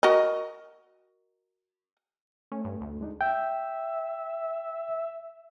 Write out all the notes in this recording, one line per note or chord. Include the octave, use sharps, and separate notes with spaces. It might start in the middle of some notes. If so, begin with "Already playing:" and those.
F#4 A#4 D#5
A3 C#4
G2
D2
G#3 D4 D#4
E5 G5